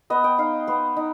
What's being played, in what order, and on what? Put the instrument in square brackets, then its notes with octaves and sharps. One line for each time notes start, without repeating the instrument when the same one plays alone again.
[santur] B3 D#5
G5
D#4 F5
B3 C5
D#4